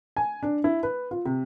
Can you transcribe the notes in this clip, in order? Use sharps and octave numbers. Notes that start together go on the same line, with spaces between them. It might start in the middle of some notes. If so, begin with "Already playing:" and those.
G#5
D4
E4
B4
F4
C3